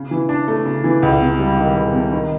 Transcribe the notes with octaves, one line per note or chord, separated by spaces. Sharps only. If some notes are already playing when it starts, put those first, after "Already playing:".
Already playing: C#3
E3
D4
A3
C#3
E3
C#2
C3
G3
D#3
C#2
C3
D#3